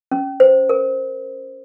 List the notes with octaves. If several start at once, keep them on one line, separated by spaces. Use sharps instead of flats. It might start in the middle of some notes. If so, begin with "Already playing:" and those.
C#4
C5
A#4